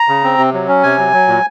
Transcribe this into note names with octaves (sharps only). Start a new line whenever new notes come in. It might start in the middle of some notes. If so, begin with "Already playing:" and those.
Already playing: A#5
C#3
C4
C3
F#3
C#4
C3 G#5
F#3
F#3
A#2